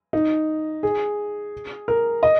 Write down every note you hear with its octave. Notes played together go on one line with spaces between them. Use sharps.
D#4
G#4
A#4
D#5